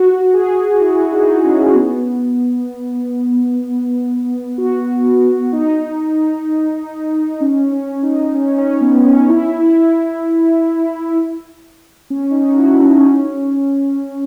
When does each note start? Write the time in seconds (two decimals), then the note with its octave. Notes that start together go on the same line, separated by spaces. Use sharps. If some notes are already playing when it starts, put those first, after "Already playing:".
Already playing: F#4
0.33 G#4
0.80 E4
1.12 D#4
1.44 C#4
1.74 B3
4.58 F#4
5.52 D#4
7.41 C#4
7.72 C#4
8.03 D#4
8.34 C#4
8.58 C#4
8.81 B3
9.05 C#4
9.28 E4
9.60 E4
12.10 C#4
12.31 D#4
12.35 C#4
12.53 F#4
12.59 E4
12.81 C#4
12.89 D#4
12.97 C#4